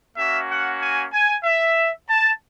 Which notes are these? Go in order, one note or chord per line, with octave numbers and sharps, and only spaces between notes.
A#3 C#4 F#4 E5
F#5
G#5
G#5
E5
A5